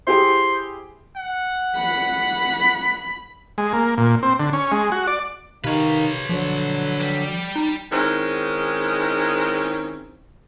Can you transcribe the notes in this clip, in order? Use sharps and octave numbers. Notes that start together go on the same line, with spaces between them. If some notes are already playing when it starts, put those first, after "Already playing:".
E4 G4 G#4 C5
F#5
B5
G#3
A#3
A#2
C4
D3
C#4
G#3
F#4
D5
C3 D#3 D#4 B4 C#5 F5
D3 F3 F#3
G3
D#4
D#3 G#3 C4 C#4 D#4 E4